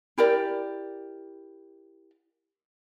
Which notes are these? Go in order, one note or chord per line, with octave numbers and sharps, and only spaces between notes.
E4 G4 A#4 D5